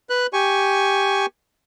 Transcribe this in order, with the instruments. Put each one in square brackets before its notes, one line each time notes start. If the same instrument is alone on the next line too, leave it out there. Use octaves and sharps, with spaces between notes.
[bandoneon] B4 F#6
G4 G#5 C#6